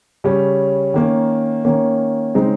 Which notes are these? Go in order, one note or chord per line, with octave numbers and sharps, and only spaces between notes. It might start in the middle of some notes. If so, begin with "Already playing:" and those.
C#3 G3 C#4
D#3 A#3 C#4
D#3 A#3 C#4
C#3 G#3 C4 D#4